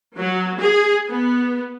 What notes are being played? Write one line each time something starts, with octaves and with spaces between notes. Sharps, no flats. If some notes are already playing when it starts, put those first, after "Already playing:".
F#3
G#4
B3